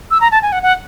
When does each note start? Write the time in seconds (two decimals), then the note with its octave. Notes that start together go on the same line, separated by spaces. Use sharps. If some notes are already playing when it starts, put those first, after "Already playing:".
0.11 E6
0.21 A#5
0.32 A5
0.42 G#5
0.52 F#5
0.63 F#5